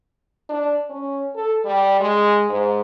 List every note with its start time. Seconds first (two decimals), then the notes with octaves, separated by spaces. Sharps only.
0.49 D4
0.90 C#4
1.35 A4
1.65 G3
2.00 G#3
2.49 G#2